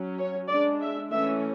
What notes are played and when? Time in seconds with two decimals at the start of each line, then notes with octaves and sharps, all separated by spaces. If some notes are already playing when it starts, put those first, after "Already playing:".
Already playing: F#3 C#4
0.18 C#5
0.49 G#3 D4 D5
0.81 E5
1.12 E3 A3 C#4 E5